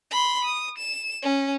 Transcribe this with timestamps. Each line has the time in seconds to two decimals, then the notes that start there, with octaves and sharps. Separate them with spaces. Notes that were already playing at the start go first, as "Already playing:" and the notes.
0.11 B5 C6
0.45 D#6
0.78 E7
1.22 C#4